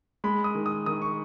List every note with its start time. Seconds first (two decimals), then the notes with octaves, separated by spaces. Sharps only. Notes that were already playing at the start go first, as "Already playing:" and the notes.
0.24 G#3 B5
0.44 D#6
0.55 D#3
0.66 D#6
0.86 D#3 D#6
1.02 C#6